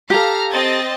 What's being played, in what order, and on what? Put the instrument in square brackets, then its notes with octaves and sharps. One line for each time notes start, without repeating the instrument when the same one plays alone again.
[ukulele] G4 A4 [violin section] F5 A#5 F6
[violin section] C4 D#5 A6